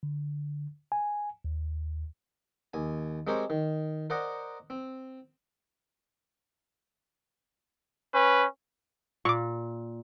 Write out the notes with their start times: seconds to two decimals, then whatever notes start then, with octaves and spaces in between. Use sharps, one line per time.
0.03 D3
0.92 G#5
1.45 D#2
2.74 D#2 G#5
3.27 G#3 C4 G4 A#4 C5 C#5
3.50 D#3
4.10 A#4 C5 D5 D#5 F#5 A#5
4.70 C4
8.14 C#4 B4
9.25 A#2 C#6 D6